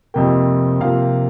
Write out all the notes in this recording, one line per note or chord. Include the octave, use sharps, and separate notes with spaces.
F2 C3 A#3 G5
C3 F3 A#3 F5